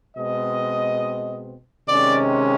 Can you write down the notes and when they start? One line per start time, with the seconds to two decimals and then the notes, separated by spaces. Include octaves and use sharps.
0.16 B2 G#3 C4 D#5
1.88 C3 D#3 G#3 C#4 D5